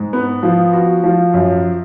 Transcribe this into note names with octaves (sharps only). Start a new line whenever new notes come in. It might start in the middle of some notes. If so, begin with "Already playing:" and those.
Already playing: G#2
B3
F3
F#4
F3
F#2